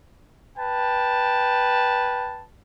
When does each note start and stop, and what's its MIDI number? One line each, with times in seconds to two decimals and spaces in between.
0.58 2.44 71
0.58 2.44 79
0.58 2.44 81